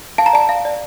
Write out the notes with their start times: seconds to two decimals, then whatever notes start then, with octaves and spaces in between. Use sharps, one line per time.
0.18 F5 A5
0.26 A#5
0.33 D5 A5
0.49 F5
0.65 D5